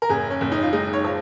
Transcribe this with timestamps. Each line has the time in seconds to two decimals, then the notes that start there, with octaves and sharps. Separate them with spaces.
0.02 A#4
0.09 F#1 G#4
0.30 C#4
0.41 F#1
0.52 D#4
0.63 F4
0.72 G#3 D#4
0.93 C#5
1.04 F3